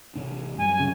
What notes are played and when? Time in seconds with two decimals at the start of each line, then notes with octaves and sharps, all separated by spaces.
0.15 A1 C3 D4
0.58 F#2 F#3 G3 G#5
0.80 C#3